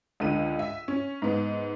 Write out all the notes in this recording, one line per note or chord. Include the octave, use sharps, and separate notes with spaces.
C#2 D3 D#7
E5
C#4
G#2 B3